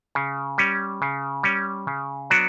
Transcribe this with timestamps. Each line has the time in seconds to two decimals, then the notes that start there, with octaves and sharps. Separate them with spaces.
0.15 C#3
0.58 G3 C#4
1.02 C#3
1.43 G3 C#4
1.87 C#3
2.30 F#3 B3 D4 F#4